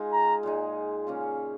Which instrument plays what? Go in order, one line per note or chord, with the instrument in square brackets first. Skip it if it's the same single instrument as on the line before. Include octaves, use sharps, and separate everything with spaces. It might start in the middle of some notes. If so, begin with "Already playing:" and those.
Already playing: [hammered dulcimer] G#3 D#4 F4 G#4
[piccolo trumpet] A#5
[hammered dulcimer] A#2 G#3 D#4
C#3 A#3 C#4 F4